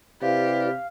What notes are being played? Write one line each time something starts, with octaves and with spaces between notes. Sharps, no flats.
C3 E4 G4 B4 D5 F5